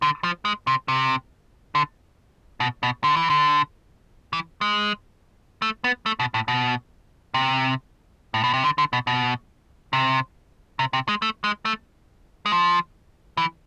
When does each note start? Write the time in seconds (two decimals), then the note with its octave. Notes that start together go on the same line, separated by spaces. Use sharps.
0.02 D3
0.24 F3
0.45 G#3
0.67 C3
0.88 C3
1.75 D3
2.60 B2
2.83 B2
3.04 D3
3.16 E3
3.30 D3
4.33 E3
4.61 G#3
5.62 A3
5.84 B3
6.06 A3
6.20 B2
6.34 A2
6.48 B2
7.34 C3
8.34 A2
8.44 B2
8.53 C3
8.64 D3
8.78 D3
8.93 B2
9.07 B2
9.93 C3
10.79 C3
10.93 C3
11.09 G#3
11.22 A3
11.44 G#3
11.65 A3
12.46 G#3
12.52 F3
13.37 E3